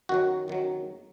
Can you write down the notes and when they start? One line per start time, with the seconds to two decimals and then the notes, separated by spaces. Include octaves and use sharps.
0.09 F#2 D#3 F#3 F#4
0.48 F#2 D#3 F#3